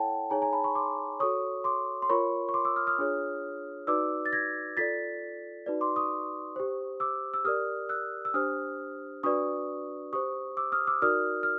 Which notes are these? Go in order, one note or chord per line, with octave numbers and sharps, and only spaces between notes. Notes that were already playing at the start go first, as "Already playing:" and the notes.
Already playing: E4 A4 C#5 F#5 G5 A5
D#4 G#4 C#5 G#5 A#5
G#5 A#5
A5 B5
B5 C#6
C6 D6
F#4 A4 C#5 C#6 D#6
C6 D6
C6
F4 A#4 C#5 B5 C#6
C#6
C6 D6
D6 E6
D#6 F6
D#6 F6
D4 F4 G#4 C#5
D#4 F#4 B4 D5 D6 E6
A6
G#6 A#6
F4 A4 D5 A6 B6
D#4 F#4 B4 D5
C6 D6
C#6 D#6
G4 C5
D6 E6
E6
G4 A#4 D5 D#6 F6
E6 F#6
E6
D4 G4 C5 D#6 F6
D4 F#4 B4 D5 C#6 D#6
G4 C5 C#6 D#6
D6 E6
D#6 F6
D6 E6
D#4 F#4 A#4 D5 D#6 F6
F6